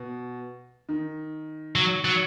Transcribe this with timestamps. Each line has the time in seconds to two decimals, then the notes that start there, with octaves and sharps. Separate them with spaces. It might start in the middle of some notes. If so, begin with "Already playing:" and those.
Already playing: B2
0.89 D#3
1.76 F#3
2.05 F#3